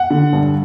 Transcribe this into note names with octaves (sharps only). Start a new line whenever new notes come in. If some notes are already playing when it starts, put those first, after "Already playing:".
Already playing: F#5
D3
G2